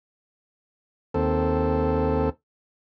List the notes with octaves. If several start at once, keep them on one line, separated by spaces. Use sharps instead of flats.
D#2 C4 A4